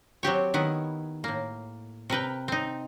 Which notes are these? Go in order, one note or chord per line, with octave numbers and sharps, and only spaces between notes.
F#3 C4 G4 C#5
D#3 B3 E4
A2 A#3
C3 A#4 B4 G5
C4 D#4